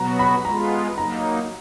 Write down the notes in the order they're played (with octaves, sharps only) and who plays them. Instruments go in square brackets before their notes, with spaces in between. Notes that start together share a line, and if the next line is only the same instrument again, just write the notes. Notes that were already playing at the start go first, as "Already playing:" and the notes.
Already playing: [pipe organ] B2 F#3 B3 F#4 [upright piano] A#5
[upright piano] B5
[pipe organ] G#3 B3 F4 [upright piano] A#5
[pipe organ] F#3 A#3 D#4 [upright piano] A#5